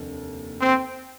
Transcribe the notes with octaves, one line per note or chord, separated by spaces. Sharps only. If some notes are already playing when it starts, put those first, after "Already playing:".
Already playing: F1 D#2 D3
C4